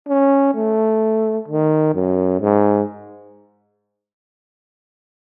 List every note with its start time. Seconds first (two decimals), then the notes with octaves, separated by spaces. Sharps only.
0.08 C#4
0.54 A3
1.48 D#3
1.95 F#2
2.41 G#2